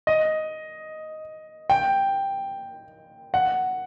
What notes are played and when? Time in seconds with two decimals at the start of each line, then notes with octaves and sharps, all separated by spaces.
0.07 D#5
1.70 G5
3.34 F#5